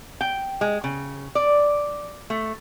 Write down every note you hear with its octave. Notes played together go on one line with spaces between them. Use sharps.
G5
G#3
C#3
D5
A3